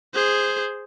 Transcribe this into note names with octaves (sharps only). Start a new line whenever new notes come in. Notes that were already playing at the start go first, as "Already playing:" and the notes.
G#4 C5